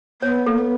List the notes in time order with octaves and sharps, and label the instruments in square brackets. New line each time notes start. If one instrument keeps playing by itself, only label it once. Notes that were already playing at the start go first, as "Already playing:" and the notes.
[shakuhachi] B3 [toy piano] C#5
[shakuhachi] A#3 [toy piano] A4
[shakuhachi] B3